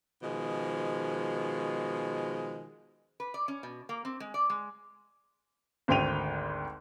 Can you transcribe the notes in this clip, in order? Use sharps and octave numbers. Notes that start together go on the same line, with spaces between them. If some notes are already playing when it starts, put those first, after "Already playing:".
B2 D#3 F3 G#3
B4
D5
C#4
B2
A#3
C4
G#3
D5
G#3
G#1 D2 C5 G5 D#7 F7